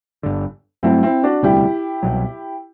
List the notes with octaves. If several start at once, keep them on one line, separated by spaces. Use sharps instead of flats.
G1 G2 D3
G2 F#3 A3 C4 E4
C4 E4
D4 F#4
E1 D2 C3 G3 E4 G4
C2 B2 F#3